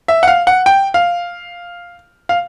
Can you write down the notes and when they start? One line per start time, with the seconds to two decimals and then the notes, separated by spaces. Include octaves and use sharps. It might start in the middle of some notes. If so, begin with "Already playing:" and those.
0.08 E5
0.23 F#5
0.28 F5
0.47 F#5
0.66 G5
0.94 F5
2.29 F5